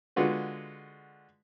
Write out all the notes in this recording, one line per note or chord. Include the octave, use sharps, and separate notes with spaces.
D3 G#3 F4 F#4 B4